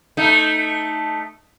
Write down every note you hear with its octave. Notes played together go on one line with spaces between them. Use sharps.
A3 D#4